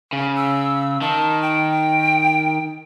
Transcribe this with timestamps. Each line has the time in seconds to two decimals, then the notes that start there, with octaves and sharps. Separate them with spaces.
0.13 C#3
0.37 E6
1.02 D#3 A5
1.42 G5